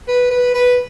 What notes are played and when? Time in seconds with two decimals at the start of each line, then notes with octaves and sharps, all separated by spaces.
0.08 B4
0.31 B4
0.54 B4